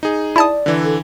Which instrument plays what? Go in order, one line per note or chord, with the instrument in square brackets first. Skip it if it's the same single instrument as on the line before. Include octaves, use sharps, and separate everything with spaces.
[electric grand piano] D#4 G#4
[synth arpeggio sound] E4 A5 D#6 [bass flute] D5
[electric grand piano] D3 E3
[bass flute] A4